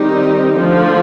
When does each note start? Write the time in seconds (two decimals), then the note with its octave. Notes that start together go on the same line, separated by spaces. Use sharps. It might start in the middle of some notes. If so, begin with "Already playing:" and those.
Already playing: D#3 G3 C4 D#4 G4
0.57 D3 F3 A3